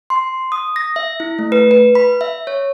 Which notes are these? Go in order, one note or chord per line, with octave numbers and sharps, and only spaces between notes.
C6
D#6
A#6
E5
E4
A3
B4
B4
B5
E5
C#5